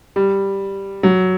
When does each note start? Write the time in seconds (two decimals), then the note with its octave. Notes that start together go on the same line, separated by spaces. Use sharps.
0.16 G3
1.03 F#3